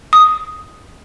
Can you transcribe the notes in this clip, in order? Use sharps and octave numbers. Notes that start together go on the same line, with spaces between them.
D#6